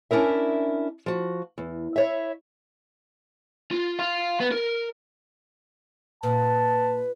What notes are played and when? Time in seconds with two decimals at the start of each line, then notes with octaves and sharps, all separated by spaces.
0.11 C#4 D4 E4 A#4 E5
1.06 F3 F#4
1.58 E2
1.96 E4 C#5 E5
3.71 F4
3.99 F5 C6
4.41 B3
4.52 A#4
6.23 A#2 B4 A5